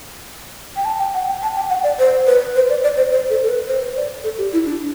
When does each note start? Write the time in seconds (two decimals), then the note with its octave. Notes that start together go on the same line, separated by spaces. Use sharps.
0.76 G5
0.85 A5
0.99 G5
1.14 F#5
1.28 G5
1.42 A5
1.56 G5
1.70 F#5
1.84 D5
1.99 C5
2.27 B4
2.55 C5
2.69 D5
2.83 D5
2.97 C5
3.11 C5
3.30 A4
3.43 A4
3.49 B4
3.68 C5
3.96 D5
4.24 A4
4.38 G4
4.53 E4
4.66 D4